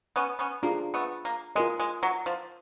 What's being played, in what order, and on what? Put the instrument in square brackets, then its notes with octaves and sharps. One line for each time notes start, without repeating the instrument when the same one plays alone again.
[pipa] B3 C#4
B3 C#4
[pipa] A#3 [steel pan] D4 F4 G#4
[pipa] A3 B3
A#3
[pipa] G#3 [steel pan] F4 A#4 D#5
[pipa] G#3
F#3
F3